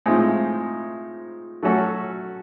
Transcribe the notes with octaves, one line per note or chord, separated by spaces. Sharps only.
A2 F3 G#3 C4 D#4
F#3 A3 C#4 F#4 A4